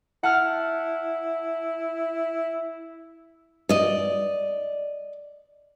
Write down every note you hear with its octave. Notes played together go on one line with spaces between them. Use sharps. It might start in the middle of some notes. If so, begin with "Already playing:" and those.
E4 F#5 A5 F6
D5 D#5